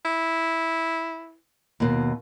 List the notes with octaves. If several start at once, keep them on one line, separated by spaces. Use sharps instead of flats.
E4
D#2 B2